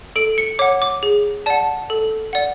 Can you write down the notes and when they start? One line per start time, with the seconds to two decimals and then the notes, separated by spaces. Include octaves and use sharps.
0.16 A4 D7
0.38 C#7
0.59 C#5 F#5 D6
0.82 D6
1.03 G#4
1.46 D5 F#5 A5
1.90 A4
2.33 D5 F#5